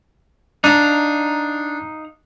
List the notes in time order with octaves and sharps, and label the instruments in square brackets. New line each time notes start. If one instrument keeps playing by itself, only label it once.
[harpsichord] D4 [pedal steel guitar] D#4 F5 A#5